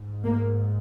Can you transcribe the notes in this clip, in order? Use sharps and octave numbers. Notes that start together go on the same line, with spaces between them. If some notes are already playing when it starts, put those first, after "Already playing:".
Already playing: G#2
A#3